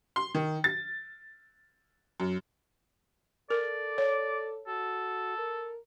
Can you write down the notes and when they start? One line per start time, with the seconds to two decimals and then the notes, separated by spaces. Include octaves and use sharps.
0.16 C6
0.35 D#3
0.64 A6
2.20 F#2
3.50 A4 A#4 D5
3.98 C#5
4.68 F#4 A4
5.38 A#4